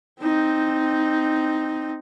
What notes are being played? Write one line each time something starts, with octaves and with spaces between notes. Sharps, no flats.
C4 D#4